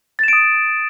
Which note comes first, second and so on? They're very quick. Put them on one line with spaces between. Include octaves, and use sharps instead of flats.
A6 E7 D7 D#6